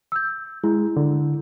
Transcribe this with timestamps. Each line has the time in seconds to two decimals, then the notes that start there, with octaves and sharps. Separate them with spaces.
0.12 E6 G6
0.64 G#3 E4
0.97 D3